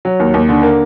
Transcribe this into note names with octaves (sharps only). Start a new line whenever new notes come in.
F#3
D#2
D#2
D3
A#3